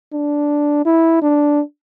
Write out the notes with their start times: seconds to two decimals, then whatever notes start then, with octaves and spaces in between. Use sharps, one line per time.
0.13 D4
0.85 E4
1.22 D4